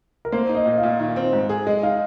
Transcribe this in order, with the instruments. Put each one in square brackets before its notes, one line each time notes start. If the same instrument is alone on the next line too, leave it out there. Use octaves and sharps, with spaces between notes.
[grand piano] A#4
[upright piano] A#3 [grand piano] C5
[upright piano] D#4
[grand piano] D#5
[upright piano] A#2
[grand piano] F5
[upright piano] A#2
[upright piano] D#3 [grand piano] F5
[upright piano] C4
G#2
G#4
[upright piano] G#3 [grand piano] D#5
[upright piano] D#4 [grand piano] F5